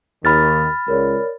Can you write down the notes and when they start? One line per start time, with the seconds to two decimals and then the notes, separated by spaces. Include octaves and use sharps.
0.25 D#2 D#3 B5 F6 A6
0.88 C#2 A#4 C#5 D5